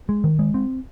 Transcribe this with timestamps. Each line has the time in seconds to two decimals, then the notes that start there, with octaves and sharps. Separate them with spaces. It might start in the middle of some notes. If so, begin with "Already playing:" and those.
0.09 G#3
0.24 D#3
0.39 G#3
0.54 C4